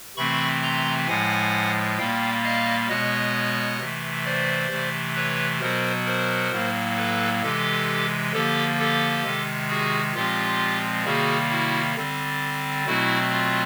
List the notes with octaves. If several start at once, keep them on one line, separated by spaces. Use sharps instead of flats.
C3 E3 A3 C4 B5 C#6
A#5 C6
A2 F3 G#3 F#5 G#5
A#2 G3 A#3 F5 G5
D#5 F5
B2 G#3 B3 C#5 D#5
C3 E3 A3
C5 D5
C3 E3 A3
B4 C#5
B2 F#3 B3 A#4 C5
A#4 C5
A2 F#3 A#3
A4 B4
C3 E3 G#3 G4 A4
D3 F3 A#3 G4 A4
G4 A4
C3 D#3 G#3
F#4 G#4
A#2 F3 G#3 C4 F4 G4
C3 D#3 G3 A#3 F#4 G#4
E4 F#4
D3 G3 C4
B2 F#3 A3 C4 E4 F#4
F4